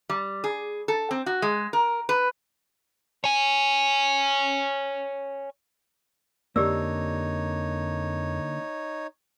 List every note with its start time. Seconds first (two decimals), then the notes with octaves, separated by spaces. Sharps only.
0.09 G3
0.44 G#4
0.88 A4
1.11 C4
1.26 F#4
1.42 G#3
1.73 A#4
2.09 B4
3.24 C#5 G#5
6.56 F2 D3 A#3 D#4 G4 C#5 D5 E6